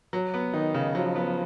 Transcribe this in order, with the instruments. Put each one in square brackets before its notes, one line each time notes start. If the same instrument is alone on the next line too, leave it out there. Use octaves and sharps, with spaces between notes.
[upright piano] F#3
B3
[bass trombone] D#3 [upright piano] D#4
[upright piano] C#3
[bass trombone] F3 [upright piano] F#3
[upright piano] B3